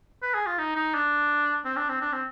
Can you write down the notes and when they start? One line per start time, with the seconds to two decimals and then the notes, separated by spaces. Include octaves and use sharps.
0.22 B4
0.34 G#4
0.47 F4
0.58 D#4
0.76 D#4
0.94 D4
1.65 C4
1.77 D4
1.89 C4
2.01 D4
2.12 C4